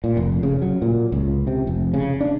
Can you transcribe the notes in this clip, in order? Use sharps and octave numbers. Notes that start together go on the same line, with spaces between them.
A#2
F1
C#3
F#3
A#2
C#2
C3
F1
C#3
D4